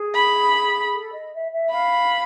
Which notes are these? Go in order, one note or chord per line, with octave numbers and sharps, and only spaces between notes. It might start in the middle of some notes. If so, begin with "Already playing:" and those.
Already playing: G#4
B5
A4
D#5
E5
E5
F5 B5